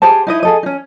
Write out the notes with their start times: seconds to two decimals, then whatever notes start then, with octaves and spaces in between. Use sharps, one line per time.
0.02 G4 G#4 C5 A5
0.27 D#4 E4 D#5
0.43 G#4 A4 D#5
0.63 C#4 D#4